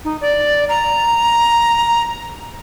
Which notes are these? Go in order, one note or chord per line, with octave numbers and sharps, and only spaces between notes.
D#4
D5
A#5